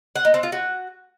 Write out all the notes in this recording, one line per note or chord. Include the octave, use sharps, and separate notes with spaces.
F#5
D#4
C4
F4
F#4